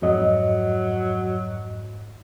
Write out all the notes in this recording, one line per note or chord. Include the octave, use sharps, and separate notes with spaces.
F2 G#2 F#3 D#5